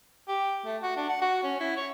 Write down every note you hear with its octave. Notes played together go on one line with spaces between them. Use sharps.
G4
A3
F#4
D4
F#5
F#4
C#4
E4
C#5